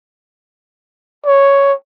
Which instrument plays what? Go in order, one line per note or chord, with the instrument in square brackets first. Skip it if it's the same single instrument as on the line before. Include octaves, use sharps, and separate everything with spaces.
[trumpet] C#5